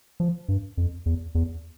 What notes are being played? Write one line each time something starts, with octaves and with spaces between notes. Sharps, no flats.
F3
G2
F2
E2
E2